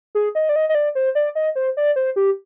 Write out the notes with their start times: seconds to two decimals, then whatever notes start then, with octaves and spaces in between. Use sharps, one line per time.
0.15 G#4
0.35 D#5
0.49 D5
0.56 D#5
0.69 D#5
0.75 D5
0.95 C5
1.15 D5
1.35 D#5
1.56 C5
1.77 D5
1.96 C5
2.16 G4